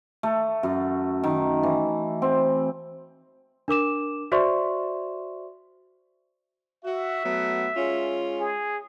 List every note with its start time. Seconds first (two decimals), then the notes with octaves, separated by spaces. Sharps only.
0.23 A3
0.63 F#2
1.24 D#3
1.63 E3
2.22 C4
3.68 D4 A#4 D6 E7
4.32 F#4 C5 D5 E5 C6 C#6
6.85 F#4 E5
7.25 F#3 A3 B3
7.77 G#3 C#4 F4
8.40 G#4